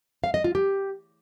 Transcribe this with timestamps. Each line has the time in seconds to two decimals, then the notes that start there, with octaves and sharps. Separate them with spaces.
0.24 F5
0.34 D#5
0.44 F4
0.55 G4